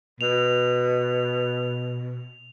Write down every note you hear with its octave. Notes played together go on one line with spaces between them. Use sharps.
B2 F7